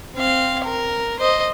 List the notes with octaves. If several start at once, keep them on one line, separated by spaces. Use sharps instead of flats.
C4 F5
A#4
C5 D#5